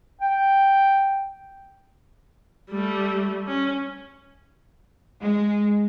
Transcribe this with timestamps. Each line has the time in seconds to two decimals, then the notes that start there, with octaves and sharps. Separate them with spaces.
0.21 G5
2.70 G3 A3
3.47 C#4
5.21 G#3